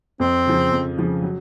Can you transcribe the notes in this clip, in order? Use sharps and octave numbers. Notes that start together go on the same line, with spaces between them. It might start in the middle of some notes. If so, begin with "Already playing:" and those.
F2 C4
C#3 F3
F2
C#3 F3
F#3